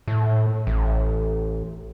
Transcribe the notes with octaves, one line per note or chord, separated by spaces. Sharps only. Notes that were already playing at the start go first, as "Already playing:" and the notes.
A2
A1